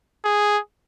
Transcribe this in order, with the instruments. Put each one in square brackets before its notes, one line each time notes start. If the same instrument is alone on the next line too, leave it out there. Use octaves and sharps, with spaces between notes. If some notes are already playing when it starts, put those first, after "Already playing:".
[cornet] G#4